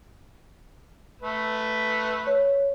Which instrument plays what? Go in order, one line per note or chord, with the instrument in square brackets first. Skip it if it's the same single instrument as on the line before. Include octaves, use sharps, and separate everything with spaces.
[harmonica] A3 B4
[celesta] C#5